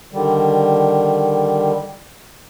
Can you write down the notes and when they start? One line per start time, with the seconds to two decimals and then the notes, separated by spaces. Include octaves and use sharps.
0.13 D3 D#3 G3